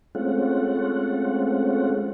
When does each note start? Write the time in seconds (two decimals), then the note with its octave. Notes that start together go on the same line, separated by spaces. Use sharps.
0.15 G#3 A3 C4 C#4 F4 F#5